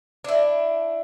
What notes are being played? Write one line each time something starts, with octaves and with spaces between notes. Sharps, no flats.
D4 E4